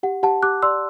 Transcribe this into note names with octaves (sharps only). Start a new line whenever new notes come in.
G4 F#5
G4 F#5 A5
G4 D6 F#6
D5 C6 E6